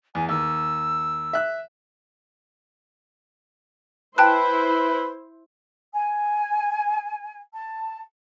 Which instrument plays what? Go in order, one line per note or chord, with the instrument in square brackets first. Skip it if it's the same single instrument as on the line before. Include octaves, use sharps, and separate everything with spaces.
[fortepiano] E2 [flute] G#5
[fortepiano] D#2 [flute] E6
[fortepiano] E5 F#6
[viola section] E4 C5 [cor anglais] B4 [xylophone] G5 A5 F#6
[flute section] G#5
A5